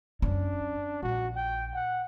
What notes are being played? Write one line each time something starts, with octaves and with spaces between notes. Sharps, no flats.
F#2 C#4 D4
A#1 F#4
G5
F#5